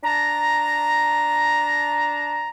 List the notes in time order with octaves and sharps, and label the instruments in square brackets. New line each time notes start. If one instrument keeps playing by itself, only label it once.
[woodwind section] D4 A5 A#5